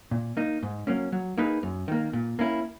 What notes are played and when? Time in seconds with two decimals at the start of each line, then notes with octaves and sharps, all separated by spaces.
0.11 A#2
0.37 A#3 D#4
0.63 G#2
0.87 F#3 A#3 C#4
1.12 F#3
1.37 A#3 D#4 G#4 B4
1.63 F#2
1.88 D#3 A#3
2.13 A#2
2.39 A#3 C#4 E4